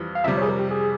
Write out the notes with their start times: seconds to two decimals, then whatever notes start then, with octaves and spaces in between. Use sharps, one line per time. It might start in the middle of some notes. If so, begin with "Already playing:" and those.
Already playing: F2 E3 G3
0.15 F5
0.24 F2 C3 G3 E5
0.36 C#5
0.42 G#4
0.48 A#4
0.59 G4
0.71 G#4